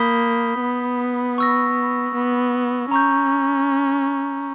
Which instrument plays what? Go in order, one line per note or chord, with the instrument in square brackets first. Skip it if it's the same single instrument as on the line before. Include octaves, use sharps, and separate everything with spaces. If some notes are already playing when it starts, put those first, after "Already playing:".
Already playing: [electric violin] A#3 [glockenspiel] B5 D#6 G6 B6 G7
[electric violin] B3
[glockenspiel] C#6 E6 A#6
[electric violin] B3
[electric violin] C#4 [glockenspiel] A#5 C#6 G6